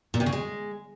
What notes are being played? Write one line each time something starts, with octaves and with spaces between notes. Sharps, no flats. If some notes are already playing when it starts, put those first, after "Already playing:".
A#2
C3
C#3
G#3